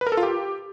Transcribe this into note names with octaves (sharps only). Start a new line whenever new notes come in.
B4
A#4
A4
F4
G4